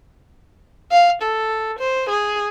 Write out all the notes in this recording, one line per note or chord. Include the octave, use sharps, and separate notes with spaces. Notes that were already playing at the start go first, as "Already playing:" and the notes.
F5
A4
C5
G#4